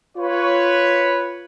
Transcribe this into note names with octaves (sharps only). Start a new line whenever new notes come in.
F4 B4 C#5